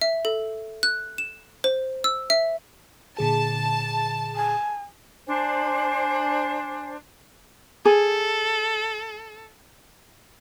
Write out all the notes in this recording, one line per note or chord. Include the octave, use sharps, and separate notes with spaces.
E5
A4
F#6
E7
C5
E6
E5
A#2 D3 G#4 A5
G#5
D4 C5 G#5
G#4 A4